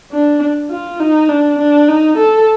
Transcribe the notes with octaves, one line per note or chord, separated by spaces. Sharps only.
D4
F4
D#4
D4
D4
D#4
A4